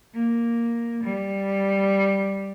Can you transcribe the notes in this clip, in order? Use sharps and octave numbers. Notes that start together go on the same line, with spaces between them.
A#3
G3